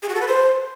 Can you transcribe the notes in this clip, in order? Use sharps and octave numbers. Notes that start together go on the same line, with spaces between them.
G#4
F#4
A4
B4
C5